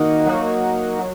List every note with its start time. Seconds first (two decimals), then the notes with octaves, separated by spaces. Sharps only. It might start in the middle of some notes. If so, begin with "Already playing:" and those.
Already playing: D#3 A#3 D#4 F#4
0.26 F#3 A#3 D#4 F#4
0.99 F#3